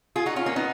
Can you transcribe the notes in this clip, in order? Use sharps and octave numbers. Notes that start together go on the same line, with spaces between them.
F4 G#4
D#4 F#4
C#4 F4
A#3 C#4
B3 D#4